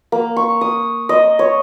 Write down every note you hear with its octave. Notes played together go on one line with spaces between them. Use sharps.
A#3
C#6
D#6
D#5
C#5